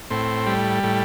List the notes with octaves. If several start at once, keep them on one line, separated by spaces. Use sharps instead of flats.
A2 C4
G3
A2